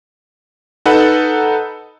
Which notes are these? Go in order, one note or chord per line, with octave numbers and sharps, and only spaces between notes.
D#4 A4 B4 F#5 A5